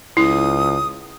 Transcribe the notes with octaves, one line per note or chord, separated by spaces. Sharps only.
C#2 E4 D#6